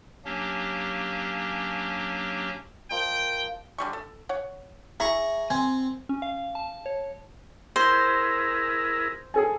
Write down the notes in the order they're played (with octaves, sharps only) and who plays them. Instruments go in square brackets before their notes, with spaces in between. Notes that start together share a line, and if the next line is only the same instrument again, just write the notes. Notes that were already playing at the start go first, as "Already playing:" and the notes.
[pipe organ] F#3 A#3 C#4 D4 G4
[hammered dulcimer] F3 A#4 D#5 [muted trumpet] G5
[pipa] D3 G3 C#6
A4
C#5 F#5
[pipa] E4 [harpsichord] G#4 A#5 C#6
[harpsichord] C4 [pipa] G#5
[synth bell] C#4
F5
A5
C#5
[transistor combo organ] E4 G#4 A#4 [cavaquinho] C5
[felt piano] G#4 A4 G#5